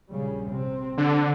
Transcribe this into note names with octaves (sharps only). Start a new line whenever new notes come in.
A#1 C#3 G3
C3 C4
D3